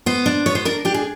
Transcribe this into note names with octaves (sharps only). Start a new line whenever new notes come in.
B3 C5
D4
B3 C#5
C5
D4 A#4
D4 G4
G#4